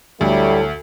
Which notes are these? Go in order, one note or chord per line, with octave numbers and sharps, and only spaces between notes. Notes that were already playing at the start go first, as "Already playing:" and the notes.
D2 A2 F#3 G3 A3